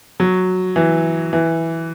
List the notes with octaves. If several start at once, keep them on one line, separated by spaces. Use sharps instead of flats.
F#3
E3
E3